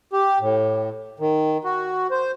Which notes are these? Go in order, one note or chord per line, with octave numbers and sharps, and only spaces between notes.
G4
A2
D#3
F#4
C5